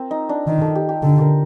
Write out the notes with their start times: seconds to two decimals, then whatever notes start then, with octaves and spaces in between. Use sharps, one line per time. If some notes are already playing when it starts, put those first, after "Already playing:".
Already playing: C4 F4 A#4
0.11 D#4
0.29 D4
0.47 D#3 D#4
0.61 A4
0.75 G4
0.89 G4
1.03 D3 A4
1.21 A#4